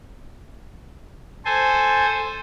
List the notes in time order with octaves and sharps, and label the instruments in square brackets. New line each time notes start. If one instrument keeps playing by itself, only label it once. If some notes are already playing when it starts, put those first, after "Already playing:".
[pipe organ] A4 C5 G#5